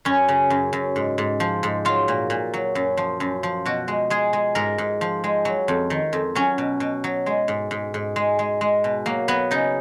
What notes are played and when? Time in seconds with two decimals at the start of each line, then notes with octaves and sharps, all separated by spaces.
0.05 F#2 C#4
0.28 C#3
0.50 F#2
0.73 F#2
0.96 G#2
1.18 G#2
1.40 F3
1.63 G#2
1.85 F#3 F4
2.08 A#2
2.30 A#2
2.54 F#3
2.75 F#2
2.97 F3
3.20 F#2
3.43 F3
3.66 B2 F#4
3.88 G#3
4.10 G#3 G#4
4.33 G#3
4.55 G#2 A#4
4.78 G#2
5.01 F3
5.24 G#3
5.45 F#3
5.68 F2
5.90 D#3
6.13 F2
6.35 F#3 C#4
6.58 B2
6.80 B2
7.04 F#3
7.26 G#3
7.48 G#2
7.71 G#2
7.94 G#2
8.16 G#3
8.39 G#3
8.61 G#3
8.84 B2
9.06 F#3 A#3
9.28 F#3 B3
9.51 C#3 D#4